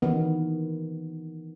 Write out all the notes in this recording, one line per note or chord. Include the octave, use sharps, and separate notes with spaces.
D#3 E3 B3